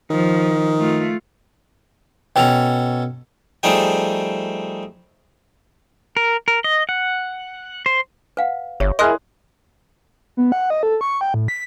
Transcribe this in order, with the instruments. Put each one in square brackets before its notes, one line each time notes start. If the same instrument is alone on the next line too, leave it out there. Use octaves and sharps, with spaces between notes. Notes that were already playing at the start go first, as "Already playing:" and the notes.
[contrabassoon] D#3 [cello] F3
[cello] A3 F4
[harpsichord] B2 C#4 A4 [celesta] G5 F7
[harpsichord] F3 G3 A3 D#4 G#4 G5
[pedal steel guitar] A#4
A#4
D#5
F#5
C5
[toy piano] B4 F5 F#5
[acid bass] G1 [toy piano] G4 C#5 E5
[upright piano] E4 G#4 D#5 [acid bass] A#4 [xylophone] C6 D#6 F#6
[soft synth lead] B3
F#5
D#5
A4
C#6
G5
A2
B6